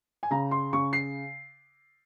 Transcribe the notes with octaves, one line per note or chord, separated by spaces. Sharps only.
G#5
C#3 A#5
C6
C#3 C#6
C7